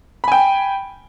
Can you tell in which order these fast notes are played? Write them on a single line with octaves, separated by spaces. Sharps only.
B5 G#5 G5